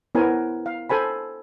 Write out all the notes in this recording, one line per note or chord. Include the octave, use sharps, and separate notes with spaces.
B3 E4 A#4 C5 C#5 G#5
F5
A4 C5 G#5 B5